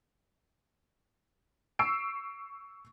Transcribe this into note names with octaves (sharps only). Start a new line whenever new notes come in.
C#6 E6 C7 D7